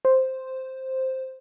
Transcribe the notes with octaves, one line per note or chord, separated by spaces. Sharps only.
C5